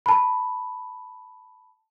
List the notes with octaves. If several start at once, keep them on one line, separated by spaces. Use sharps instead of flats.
A5 B5